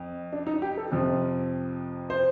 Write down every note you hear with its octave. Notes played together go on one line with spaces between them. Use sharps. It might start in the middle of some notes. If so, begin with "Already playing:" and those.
Already playing: F2
D4
D#4
G4
A4
F2 C3 F3
C5